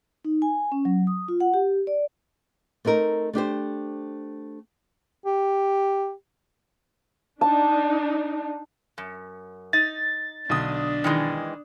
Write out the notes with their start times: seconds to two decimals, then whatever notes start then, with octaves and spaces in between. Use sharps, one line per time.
0.25 D#4
0.42 G#5
0.72 C#4
0.85 F#3
1.07 D#6
1.28 F4
1.40 F#5
1.54 G4
1.87 D5
2.85 A3 C4 D#4 A#4
3.33 A3 D4 G4 C5
5.26 G4
7.41 D4 D#4 A5
8.98 F#2
9.73 D#4 A6
10.49 B1 D3 D4 D#6
11.04 D#3 E3 G#3